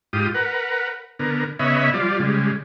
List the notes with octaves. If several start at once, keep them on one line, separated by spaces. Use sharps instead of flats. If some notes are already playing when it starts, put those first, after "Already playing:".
G#2 F4 G4 D#6
A#4 B4 F#5
D3 B3 A#4
C#3 B3 C#5 D#5 E5 B5
F3 G3 F4 D5
C#3 G3 G#3